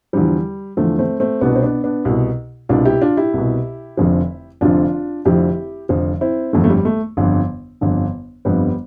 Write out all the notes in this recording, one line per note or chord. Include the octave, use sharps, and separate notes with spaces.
E2 D3 F3 G3
E2 D3 F3 A3
A3 C4
A3 C4
C2 B2 B3 D4
C4
B3 D4
B3 D4
C2 B2
C2 B2 D4 F4
E4 G4
D4 F4
E4 G4
C2 B2
F1 F2 D3 F3
F1 F2 D3 F3 D4 F4
F1 F2 D3 F3 E4 G4
F1 F2 D3 F3
C4 E4
G1 F2 D3 A3
A3
G3
A3
G1 F2 D3
G1 F2 D3
G1 F2 D3 G3 B3